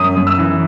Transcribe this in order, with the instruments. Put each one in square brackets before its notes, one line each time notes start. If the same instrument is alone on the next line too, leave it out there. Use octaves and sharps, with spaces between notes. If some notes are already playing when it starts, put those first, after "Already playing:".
Already playing: [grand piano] F#2 D#6
F#2
E6
E3